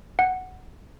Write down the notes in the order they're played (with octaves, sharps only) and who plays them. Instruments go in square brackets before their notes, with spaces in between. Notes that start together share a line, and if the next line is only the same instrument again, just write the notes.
[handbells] F#5